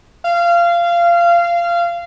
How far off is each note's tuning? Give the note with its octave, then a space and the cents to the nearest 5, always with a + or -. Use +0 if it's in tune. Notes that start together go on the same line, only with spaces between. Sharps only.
F5 -20